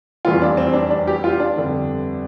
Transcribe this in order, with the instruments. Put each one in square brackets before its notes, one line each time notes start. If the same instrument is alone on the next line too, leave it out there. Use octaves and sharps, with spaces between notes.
[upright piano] F1 E2 E3 G3 F4
D4
C4
D4
D4
G4
F4
D4
G1 F2 D3 G3